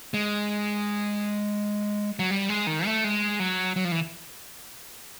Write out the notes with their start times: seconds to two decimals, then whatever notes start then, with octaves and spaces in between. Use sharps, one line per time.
0.14 G#3
2.19 F#3
2.30 G3
2.49 G#3
2.67 D#3
2.86 A3
3.04 G#3
3.40 F#3
3.76 F#3
3.85 F3
3.92 E3